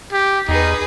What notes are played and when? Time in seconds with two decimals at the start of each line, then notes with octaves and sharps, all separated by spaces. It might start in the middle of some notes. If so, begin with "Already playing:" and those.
0.13 G4
0.49 E2 D#4 G#4 B4